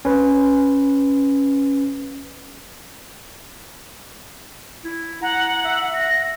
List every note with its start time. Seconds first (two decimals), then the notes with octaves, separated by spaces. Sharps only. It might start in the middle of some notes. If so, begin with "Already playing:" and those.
0.05 C#4 B4
4.85 E4
5.22 F#5 A#5
5.65 E5
5.94 A#6